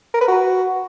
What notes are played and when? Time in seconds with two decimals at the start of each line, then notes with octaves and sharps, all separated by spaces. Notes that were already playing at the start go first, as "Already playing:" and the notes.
0.14 A#4
0.21 B4
0.28 F#4